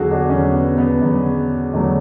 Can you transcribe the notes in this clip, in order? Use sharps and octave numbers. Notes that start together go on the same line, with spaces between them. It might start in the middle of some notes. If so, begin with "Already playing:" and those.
Already playing: E2 D3 F#3 F#4 G#4 A4
D4
E2 D3 F#3 C#4
B3
B3
E2 D3 F#3
E2 D3 F#3 A3